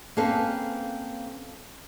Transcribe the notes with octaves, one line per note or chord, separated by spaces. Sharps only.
A#3 C4 C#4 A4 B4 F5